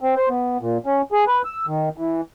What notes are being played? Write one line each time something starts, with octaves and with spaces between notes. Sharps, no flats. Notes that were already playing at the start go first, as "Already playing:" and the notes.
C4
C5
B3
A#2
C#4
G#4
B4
E6
D#3
E3